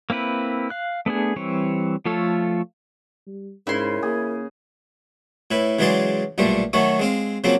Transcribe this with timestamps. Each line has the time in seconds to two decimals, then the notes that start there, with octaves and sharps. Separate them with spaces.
0.10 A#3 C4 E4 B4
0.70 F5 F#6
1.06 A3 B3 D4 G#4
1.36 E3 G3 C4 C#5
2.06 F3 A3 F4 A4 C#5
3.26 G3
3.67 G#2 C#3 E4 A#4 C6
4.03 A#3 G#4
5.51 A2 E4 B4
5.79 C#3 E3 F#3 G#3 D5 C6
6.38 B1 A#2 G3 A3 C5
6.73 D#3 F#3 A3 F#4 C#5
6.99 G#3 C4 F5
7.44 C#3 F3 F#3 A#3 C4